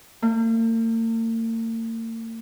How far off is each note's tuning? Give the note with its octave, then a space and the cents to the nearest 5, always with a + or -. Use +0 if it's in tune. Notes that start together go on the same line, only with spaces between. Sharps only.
A#3 -45